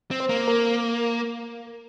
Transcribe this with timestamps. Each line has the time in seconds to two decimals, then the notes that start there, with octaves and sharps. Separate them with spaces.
0.11 C4
0.20 C5
0.29 A#3
0.48 A#4